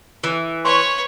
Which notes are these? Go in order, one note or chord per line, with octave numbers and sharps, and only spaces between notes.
E3
B4 C#5 C6 C#6